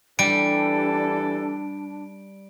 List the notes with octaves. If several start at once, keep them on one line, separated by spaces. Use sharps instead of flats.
E3 G3 D4 G4 A4 D7